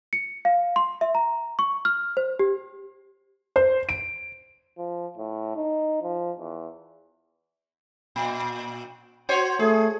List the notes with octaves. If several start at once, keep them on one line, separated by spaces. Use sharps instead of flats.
C#7
F5
C6
E5
A#5
C#6
F6
C5
G4
C5
D7
F3
A2
D#4
F3
E2
A#2
F#4 C5 C#5
A3 G#4